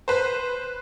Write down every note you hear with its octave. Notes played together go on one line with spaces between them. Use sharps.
B4 C5